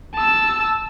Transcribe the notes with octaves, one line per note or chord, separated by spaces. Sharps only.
A5 E6